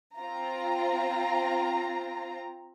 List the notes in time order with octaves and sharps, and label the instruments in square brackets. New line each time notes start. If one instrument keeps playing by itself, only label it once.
[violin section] C4 F4 A#5